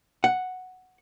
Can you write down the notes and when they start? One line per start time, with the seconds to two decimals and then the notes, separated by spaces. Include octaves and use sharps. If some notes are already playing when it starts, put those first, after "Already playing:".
0.24 F#5